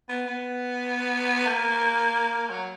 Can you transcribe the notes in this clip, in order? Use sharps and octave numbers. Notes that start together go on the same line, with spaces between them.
B3
B3
A#3
F#3